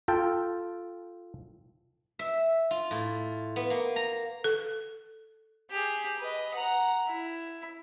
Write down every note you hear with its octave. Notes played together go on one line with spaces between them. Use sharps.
F4 A4 G5 A5
E5
F4
A2
B3
A#3
A#5
A4
G4 G#4
B4 D#5
F#5 A#5
E4